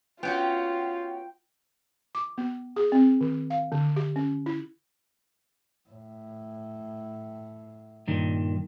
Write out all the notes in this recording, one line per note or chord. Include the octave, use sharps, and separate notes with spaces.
B3 C#4 F4 F#4 G5
D6
B3
G#4
C4
D#3
F5
D3
G4
C#4
E4
A2
G2 A#2 D#3